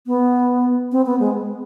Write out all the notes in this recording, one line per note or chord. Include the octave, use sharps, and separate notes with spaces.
B3
C4
B3
G#3